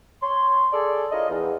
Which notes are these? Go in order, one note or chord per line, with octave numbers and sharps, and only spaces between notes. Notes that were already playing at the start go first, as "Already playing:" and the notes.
C#5 C6
G#4 A4 D5
D4 E4 F4 A#4 C#5 D#5
E2